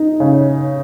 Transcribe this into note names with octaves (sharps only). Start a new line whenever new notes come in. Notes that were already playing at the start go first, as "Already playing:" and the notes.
Already playing: D#4
C#3